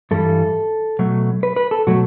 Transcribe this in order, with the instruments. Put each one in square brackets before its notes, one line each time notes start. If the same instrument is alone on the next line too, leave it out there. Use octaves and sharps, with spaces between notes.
[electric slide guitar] G2 E3 G3 A4
B2 F#3 A3
B4
B4
A4
B2 F#3 A3 F#4